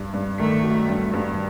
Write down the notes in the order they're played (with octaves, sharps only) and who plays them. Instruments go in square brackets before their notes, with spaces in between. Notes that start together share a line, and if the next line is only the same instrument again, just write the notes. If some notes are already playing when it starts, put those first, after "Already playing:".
Already playing: [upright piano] G2
G2
[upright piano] D#3 [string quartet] A3
[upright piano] F#3
G2
G2